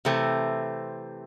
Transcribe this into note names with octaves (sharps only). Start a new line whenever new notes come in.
C3 E3 A3 C4